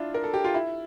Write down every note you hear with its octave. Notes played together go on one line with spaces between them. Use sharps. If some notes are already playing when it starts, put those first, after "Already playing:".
Already playing: D4 E4 F4
A#4
A4
G4
F4
E4